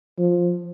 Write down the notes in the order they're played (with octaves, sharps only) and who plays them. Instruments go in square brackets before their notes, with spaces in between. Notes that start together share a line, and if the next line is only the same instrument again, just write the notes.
[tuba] F3